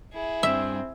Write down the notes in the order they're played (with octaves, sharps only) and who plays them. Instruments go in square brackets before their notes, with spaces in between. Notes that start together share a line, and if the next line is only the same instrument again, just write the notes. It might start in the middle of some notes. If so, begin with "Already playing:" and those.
[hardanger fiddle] E4 G#4
[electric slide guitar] G2 D4 [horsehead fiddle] C4 [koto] E5